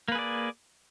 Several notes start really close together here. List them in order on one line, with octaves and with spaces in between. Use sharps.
A#3 B4 G#4 D5